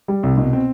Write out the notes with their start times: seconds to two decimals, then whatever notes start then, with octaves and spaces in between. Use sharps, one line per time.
0.08 G3
0.23 C2
0.38 B2
0.53 C4